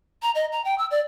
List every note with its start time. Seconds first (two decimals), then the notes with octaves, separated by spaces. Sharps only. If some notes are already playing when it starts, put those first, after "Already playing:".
0.22 A#5
0.35 D#5
0.52 A#5
0.65 G5
0.78 E6
0.91 D5